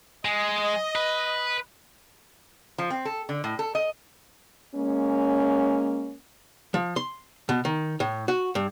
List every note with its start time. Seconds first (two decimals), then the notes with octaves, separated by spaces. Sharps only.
0.25 G#3 D#5
0.95 B4
2.78 F3
2.90 C4
3.05 A4
3.29 D3
3.44 A2
3.59 A4
3.75 D#5
4.75 G#3 A#3 C#4
6.74 F3
6.96 C6
7.49 B2
7.65 D#3
8.00 A2
8.28 F#4
8.55 G2